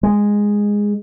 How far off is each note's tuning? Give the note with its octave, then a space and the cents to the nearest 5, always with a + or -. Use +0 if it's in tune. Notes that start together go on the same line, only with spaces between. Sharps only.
G#3 -10